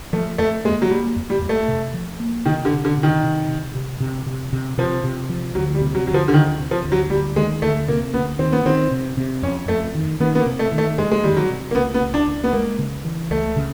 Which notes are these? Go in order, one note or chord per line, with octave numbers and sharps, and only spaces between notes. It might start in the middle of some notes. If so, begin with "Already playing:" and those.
F3 A3
F2 A3
G#3 A#3
F#3
G3 A#3
F2
G3
F2
A3
C3
F3
A#3
C3 D#3
D3
C3
D3
C3
D#3
C3
C3
C3
C3
C3
C3
C3 F3
C3
F3
D2 F#3
G3
C3
F#3
D2 F#3
F3
D3
D2 D#3
C3
F3
D2
F#3
D2 G3
D#3 G#3
D2 A3
C3 A#3
D2 B3
D#3 C4
B3
D#3 C4
C3
C3
F2 C#4
F2 A3
D#3
D#3 B3
B3
A#3
C3
A3
D#3
A3
F2 G#3
G#3
D#3 G3
F#3
C3
A#3
C#2 B3
B3
C#2
D4
C#2
B3
G#3 A#3
C#3
E3
C#2 A3
C#3